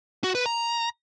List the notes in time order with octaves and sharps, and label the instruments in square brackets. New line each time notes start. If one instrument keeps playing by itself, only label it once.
[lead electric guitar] F#4
B4
A#5